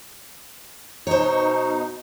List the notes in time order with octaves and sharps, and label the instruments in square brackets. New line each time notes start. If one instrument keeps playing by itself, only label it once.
[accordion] B2 D#4 [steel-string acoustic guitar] C5 C#5